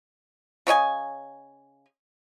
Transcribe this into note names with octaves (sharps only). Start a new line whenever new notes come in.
C#3 C#5 D#5 G#5